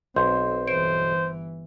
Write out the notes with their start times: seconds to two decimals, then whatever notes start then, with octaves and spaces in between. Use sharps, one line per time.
0.16 B1 C4 C6 G6
0.68 G1 E3 C5 D7